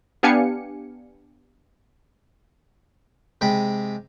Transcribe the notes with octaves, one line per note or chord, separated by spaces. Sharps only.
B3 D4 G4 F5 G#5 C#7
C3 G#3 G5 B5